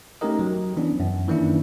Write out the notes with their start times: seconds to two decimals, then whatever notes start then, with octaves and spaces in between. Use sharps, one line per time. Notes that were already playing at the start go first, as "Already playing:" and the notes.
0.21 A3 C#4 D#4 G4 A#4 D#5
0.39 F#3
0.77 E3 B3 C#4 D4
1.00 F#2
1.28 D#3 E3 A#3 C#4 D4 E4